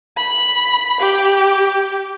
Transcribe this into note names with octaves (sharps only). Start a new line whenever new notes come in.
B5
G4